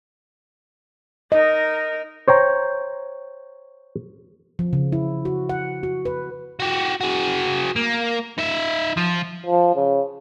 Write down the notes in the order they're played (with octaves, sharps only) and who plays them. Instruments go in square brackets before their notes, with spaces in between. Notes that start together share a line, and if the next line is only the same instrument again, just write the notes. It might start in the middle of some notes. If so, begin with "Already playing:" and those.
[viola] D#4 A#4 [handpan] D#5
[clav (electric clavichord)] C5 C#5 G5 A#5
[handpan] F3
C#3
E4
F#4
F#5
F#4
B4
[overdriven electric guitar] F#4 G4
F#4 G#4
A#3
D#4 E5
F3
[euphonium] F3
C#3